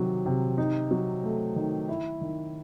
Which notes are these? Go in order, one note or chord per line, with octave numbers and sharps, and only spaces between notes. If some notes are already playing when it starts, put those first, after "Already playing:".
Already playing: C3 D#3 F#3
C3
D#4
F#3
A3
D#3
E4
D#3